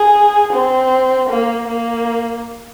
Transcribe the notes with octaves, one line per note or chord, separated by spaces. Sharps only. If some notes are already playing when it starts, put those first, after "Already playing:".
Already playing: G#4
C4
A#3
A#3